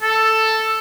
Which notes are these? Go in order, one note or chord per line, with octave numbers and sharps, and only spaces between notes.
A4